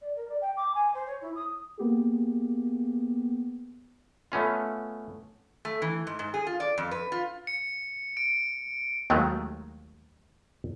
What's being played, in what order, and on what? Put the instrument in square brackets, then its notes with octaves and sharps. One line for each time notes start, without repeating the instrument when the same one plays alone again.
[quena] D5
A#4
D5
G5
D6
G#5
C5
C#5
E4
D#6
[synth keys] A#3 B3 G4 G#4
[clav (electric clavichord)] A3 B3 C#4 F4
[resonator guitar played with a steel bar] A3
E3
G#2
G#2
G#4
F4
D5
F2
B4
F4
[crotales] C#7
D7
[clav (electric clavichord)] D#2 D#3 F#3 G#3 A3